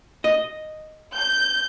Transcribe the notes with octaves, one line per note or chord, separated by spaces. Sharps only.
D#5
G6